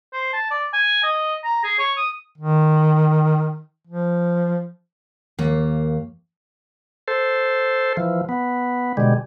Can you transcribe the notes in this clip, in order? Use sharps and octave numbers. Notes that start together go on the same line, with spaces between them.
C5
A5
D5
G#5
D#5
A#5
G#4
C#5
D#6
D#3
F3
D#2 A#3
A4 C5
E3 F3
B3
B2 D3 G3 G#3